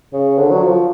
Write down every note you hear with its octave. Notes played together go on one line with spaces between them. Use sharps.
C#3
D3
F#3
F3